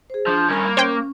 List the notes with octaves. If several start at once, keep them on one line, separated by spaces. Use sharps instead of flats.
G#4 C5
F3 D4
D#3 G3 C#4 A#4 B5
A#3
C#4 C5 C#5 G5